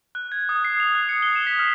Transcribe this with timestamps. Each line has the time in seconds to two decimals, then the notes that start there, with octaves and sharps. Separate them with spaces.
0.15 F#6
0.32 G#6
0.49 D#6
0.65 C7
0.80 F7
0.95 F#6
1.09 C#7
1.23 G7
1.36 E7
1.47 B6
1.59 F6